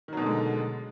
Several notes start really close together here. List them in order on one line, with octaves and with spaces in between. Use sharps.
D#3 F#3 B2 D3 G#3